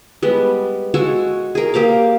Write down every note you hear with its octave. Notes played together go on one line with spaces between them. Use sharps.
G3 G#3 B3
G#3 F#4 A4 C#5
G#4 A#4
A#3 G4 C5 F5